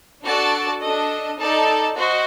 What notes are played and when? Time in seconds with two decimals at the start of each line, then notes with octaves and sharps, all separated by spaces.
0.23 D4 F#4 A4 D5 A5
0.81 D4 A4 D#5
1.38 D#4 A4 D5 A5
1.96 F#4 C5 D#5